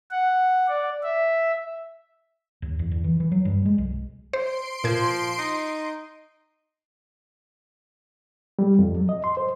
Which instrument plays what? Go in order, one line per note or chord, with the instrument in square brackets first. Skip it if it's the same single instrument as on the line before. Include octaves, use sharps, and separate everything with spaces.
[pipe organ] F#5
D5
E5
[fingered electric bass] D#2
E2
E2
E3
E3
F#3
G2
G#3
B1
[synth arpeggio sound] C5 [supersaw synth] C6 C7 D7
[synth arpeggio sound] A#2 G#6 [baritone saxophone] F3
[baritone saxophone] D#4
[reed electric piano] G3
F2
F#3
D#5
C6
C5